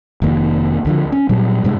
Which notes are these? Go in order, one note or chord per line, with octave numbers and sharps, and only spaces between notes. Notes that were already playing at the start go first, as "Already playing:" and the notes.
F1 D#3 A#3
C#2 D3 F3
C#4
A#2 F#3 G3
G2 C3 G3 G#3